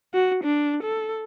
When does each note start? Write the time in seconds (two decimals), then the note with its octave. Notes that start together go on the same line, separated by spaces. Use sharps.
0.14 F#4
0.44 D4
0.83 A4